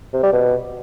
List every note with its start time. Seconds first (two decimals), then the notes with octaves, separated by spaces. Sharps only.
0.13 C3
0.23 G3
0.33 B2